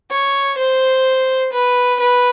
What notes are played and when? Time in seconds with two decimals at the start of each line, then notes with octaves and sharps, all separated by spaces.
0.11 C#5
0.58 C5
1.53 B4
2.00 B4